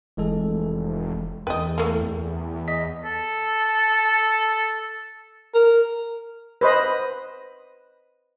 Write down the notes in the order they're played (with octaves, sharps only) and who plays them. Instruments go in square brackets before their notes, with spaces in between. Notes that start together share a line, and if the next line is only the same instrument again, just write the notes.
[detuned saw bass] F1 [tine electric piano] E3 G#3 A4
[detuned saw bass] E2 [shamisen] B4 D#5 [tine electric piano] G5
[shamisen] A3 A#3
[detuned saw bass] E2
[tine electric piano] D#5 B6
[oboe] A4
[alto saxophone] A#4
[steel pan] B4 C5 D#5